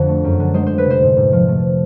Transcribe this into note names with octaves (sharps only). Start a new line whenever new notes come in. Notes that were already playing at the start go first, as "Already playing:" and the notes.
Already playing: F2 D3 C5
A3
F#2
D3
G#3 C5
F2 C5
B4
C3 C5
G#2
G#2
F3
A3